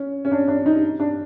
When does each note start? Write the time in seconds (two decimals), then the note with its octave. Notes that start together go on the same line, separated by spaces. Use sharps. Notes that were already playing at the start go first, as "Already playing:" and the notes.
Already playing: C#4
0.25 C#4
0.32 D4
0.48 D4
0.66 D#4
1.00 D4